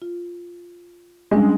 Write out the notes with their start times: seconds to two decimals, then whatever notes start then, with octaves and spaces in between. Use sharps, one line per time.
0.02 F4
1.31 G3 G#3 C#4 D4